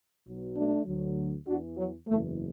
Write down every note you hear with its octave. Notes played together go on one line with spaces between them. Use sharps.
B1 B2 F#3
A3 D4
D2 D3 F#3
E2 E3 D4 F#4
F#3
F#1 E2 E3 A3